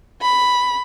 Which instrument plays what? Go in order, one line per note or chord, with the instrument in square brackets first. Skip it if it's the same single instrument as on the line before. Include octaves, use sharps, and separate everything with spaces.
[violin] B5